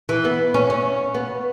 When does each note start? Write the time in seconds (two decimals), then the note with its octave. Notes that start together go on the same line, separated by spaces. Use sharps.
0.09 E3
0.25 B3
0.54 C#4
0.70 C#4
1.14 B3